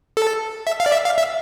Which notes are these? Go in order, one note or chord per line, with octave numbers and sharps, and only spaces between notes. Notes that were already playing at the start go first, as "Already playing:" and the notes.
A4
E5
F5
D5
E5
F5
E5